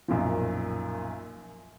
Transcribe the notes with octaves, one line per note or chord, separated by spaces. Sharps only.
B1 F#2 A#2 F3